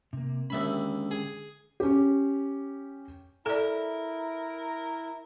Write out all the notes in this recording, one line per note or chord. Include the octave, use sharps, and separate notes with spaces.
C3 A#3
D#2 D3 G#3 C#4 E5 B5
G#4
C#4 G4
E4 A4 A#4 D5